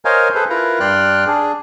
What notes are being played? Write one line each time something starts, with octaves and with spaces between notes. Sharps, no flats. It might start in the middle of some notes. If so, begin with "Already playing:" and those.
A#4 C5 C#5 D#5 F5 G#5
G#4 A4 B4 C5
E4 F4 A#4 B4 A#5
G2 D5 G5 C6 F6 F#6
D4 G#4